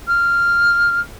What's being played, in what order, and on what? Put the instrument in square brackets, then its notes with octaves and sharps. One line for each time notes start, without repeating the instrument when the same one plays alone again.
[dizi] F6